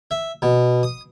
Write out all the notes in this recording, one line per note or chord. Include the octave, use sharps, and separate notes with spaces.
E5
B2
D#6